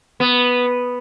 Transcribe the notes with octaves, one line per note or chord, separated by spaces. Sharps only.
B3